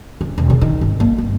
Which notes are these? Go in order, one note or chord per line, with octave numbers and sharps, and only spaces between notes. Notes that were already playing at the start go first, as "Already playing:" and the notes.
D2
E1
C#3
D#3
G#1
A#3
G2